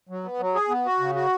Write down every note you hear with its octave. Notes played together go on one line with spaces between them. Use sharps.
F#3
B3
F#3
G#4
B3
F#4
C#3
F#4